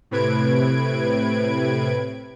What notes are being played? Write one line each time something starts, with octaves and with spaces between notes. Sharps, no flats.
A2 C3 B4 G#6 D7